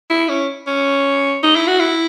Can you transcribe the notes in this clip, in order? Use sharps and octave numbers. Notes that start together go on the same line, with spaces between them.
E4
C#4
C#4
D#4
E4
F#4
E4